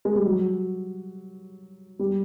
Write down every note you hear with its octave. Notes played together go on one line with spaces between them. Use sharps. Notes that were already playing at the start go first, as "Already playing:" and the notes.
G#3
G3
F#3
G3